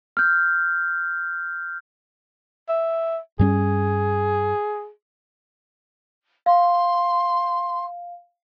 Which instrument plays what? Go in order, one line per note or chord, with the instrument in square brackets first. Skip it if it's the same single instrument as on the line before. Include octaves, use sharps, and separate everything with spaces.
[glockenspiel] F6 G6
[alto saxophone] E5
[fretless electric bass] G2 G3 C#4 [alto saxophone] G#4
[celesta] F5 [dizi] C6